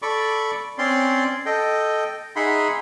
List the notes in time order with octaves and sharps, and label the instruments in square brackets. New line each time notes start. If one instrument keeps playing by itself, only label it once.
[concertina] A4 D5 B5 C#6 D6
C4 C#4 D5 C6
A4 D#5 G5
D#4 G#4 E5 F#5 B5 C6